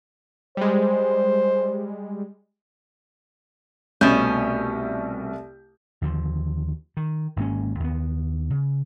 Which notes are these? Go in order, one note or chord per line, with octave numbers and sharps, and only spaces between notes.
G3 G#3 C5
C2 B2 A3 C#4 G6
D#2 D3 F3
D#3
G#1 G#2 A#3 C#4
D#2 B3
C#3